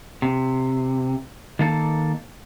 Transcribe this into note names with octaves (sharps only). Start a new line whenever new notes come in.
C3
D#3 A#3 A4